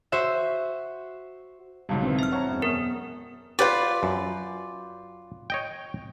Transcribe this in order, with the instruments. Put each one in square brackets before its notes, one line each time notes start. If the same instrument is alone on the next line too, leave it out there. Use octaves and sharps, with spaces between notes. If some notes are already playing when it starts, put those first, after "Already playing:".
[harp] F#4 C5 E5
[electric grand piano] B1 G#2 F#3 [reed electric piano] C#3 G3 [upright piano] F5 A5
[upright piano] D#3 E4 [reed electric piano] C4 B4
[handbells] E5 F6
[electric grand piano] C5 F#5 C#6 [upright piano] C#5 A5 A#5
[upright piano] E1 F#2
[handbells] B3 A#4 [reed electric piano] D#6
[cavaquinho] F4 D5 [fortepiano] G4 B4
[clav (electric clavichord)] F#2
C#5 D#5 G5